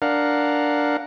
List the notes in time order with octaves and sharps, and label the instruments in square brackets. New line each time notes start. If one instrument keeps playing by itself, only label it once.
[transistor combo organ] D4 A#4 F5 F#5